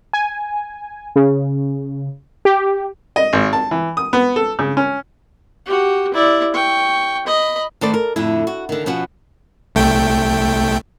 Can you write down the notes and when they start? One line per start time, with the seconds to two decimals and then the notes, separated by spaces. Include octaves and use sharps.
0.13 G#5
1.16 C#3
2.45 G4
3.16 D#5
3.33 G#1
3.53 A5
3.71 E3
3.97 D#6
4.13 B3
4.36 A4
4.59 C#3
4.77 C#4
5.66 F#4 G4
6.14 E4 D5
6.54 G5 C#6
7.27 D#5 B5
7.81 D#3 A3 A4 B4 C5 D5
7.94 A#4
8.16 F2 A2 D3 E4
8.47 F#4
8.69 D3 D#3
8.86 B2 F3 C#4 F#4 B4 F#5
9.75 C2 A3 G5